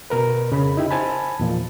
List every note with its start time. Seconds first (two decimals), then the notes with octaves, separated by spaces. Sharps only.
0.10 B2 A#4 B4
0.50 F2 C#3 B5
0.77 D#4 E4 G4
0.91 C5 G#5 A5 B5
1.39 E2 A#2 F3